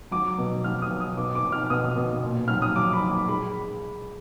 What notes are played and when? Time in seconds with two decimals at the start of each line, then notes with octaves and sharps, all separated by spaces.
0.11 F#3 D6
0.38 B2
0.64 F#3 F6
0.82 D#6
0.91 B2
1.00 D#6
1.17 B2 D6
1.35 D6
1.44 B2
1.52 F6
1.70 B2 D#6
1.96 B2
2.23 A#2
2.48 F#3 F6
2.62 D#6
2.76 F#3 D6
2.93 B5
3.02 A#2
3.11 D6
3.28 G#3 B5